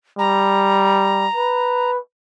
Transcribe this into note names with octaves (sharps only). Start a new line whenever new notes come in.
G3 A#5
B4